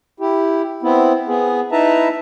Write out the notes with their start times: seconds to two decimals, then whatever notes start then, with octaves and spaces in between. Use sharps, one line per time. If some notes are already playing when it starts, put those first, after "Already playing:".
0.20 E4 G4
0.83 B3 C4 E4
1.28 B3 G#4
1.72 D#4 E4 B4 E5 A5 A#5